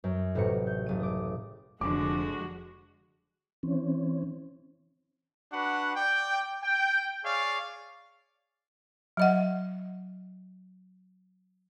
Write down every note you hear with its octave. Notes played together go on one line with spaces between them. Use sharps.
F#2
A1 A2 C3 F#4 C#7
G6
F#1 D#7
D6 D#6
F1 D3 F3 G#3 F#4 D6
E3 C4 C#4
D4 F#4 B4 F#5
D5 G5
G5
G#4 C#5 D5 F5
F#3 D#5 F#5